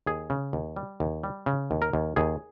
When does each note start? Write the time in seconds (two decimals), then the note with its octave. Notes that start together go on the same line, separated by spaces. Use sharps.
0.06 D#2 G#4
0.30 C#3
0.53 D#2
0.76 G3
1.00 D#2
1.23 G3
1.46 C#3
1.71 D#2
1.82 A#4
1.93 D#2
2.16 D#2 G#4